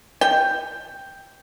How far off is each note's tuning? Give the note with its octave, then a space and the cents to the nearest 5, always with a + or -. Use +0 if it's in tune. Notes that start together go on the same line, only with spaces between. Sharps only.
G5 +0